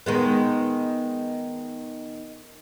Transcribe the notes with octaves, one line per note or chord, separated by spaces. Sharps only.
D#3 G#3 B3